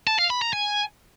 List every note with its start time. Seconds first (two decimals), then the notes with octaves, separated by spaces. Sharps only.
0.07 A5
0.19 F5
0.30 B5
0.42 A#5
0.53 G#5